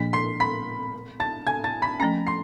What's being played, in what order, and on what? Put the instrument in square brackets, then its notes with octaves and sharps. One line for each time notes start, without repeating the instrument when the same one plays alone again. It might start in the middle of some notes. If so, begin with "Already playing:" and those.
Already playing: [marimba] A#2 F3 A#3 D4 [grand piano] B6
[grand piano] C6 C7
B5 B6
A5 A6
G#5 G#6
A5 A6
B5 B6
[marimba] F3 A3 C#4 [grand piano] A#5 A#6
[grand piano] C6 C7